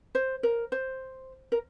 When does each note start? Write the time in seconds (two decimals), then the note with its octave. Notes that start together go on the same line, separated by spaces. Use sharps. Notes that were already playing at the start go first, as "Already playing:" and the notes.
0.15 C5
0.43 A#4
0.72 C5
1.52 A#4